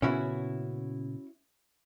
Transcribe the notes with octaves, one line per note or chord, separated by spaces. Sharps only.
A#2 C#3 B3 C#4 E4 F#4